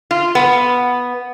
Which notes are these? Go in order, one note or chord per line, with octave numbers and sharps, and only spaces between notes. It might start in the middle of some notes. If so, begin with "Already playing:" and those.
F4
B3